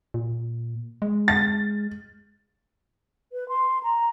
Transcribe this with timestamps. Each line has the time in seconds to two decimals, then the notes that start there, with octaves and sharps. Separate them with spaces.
0.14 A#2
1.02 G#3
1.28 A6
3.33 B4
3.49 C6
3.83 A#5